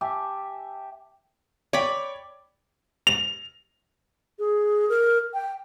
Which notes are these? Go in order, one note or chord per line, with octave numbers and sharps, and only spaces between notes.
G4 E5 G#5 A5
C#5 D5 G5 B5
F7
G#4
A#4
G5